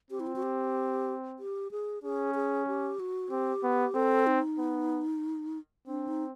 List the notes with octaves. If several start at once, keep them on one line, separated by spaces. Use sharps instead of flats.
C4 G4
E4
F4
F#4
G4
G4
G#4
C#4 G#4
G#4
G4
F#4
C4 G4
B3
C4 A4
D#4
B3
C4 D4
D#4